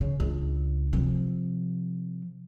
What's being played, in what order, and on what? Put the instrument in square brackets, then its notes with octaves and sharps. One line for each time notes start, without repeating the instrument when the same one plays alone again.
[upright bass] C#3
C#2 D4
C3 F3